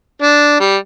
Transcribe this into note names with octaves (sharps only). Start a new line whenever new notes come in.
D4
G3